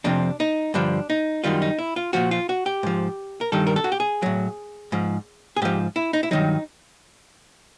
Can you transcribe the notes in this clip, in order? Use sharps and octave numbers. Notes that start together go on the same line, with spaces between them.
F2 C3 F3 D4
D#4
G2 D3 F3 D4
D#4
F#2 D#3 G3 F4
D#4
E4
F4
A#2 F3 F#4
F4
F#4
G4
G#2 F3
A#4
G2 D#3 G3 A4
A#4
A4
F#4
G4
G#4
A2 F#3
G#2 F3
G#4
G#2 F3 G4
E4
D#4
E4
G2 D#3 F#3 D#4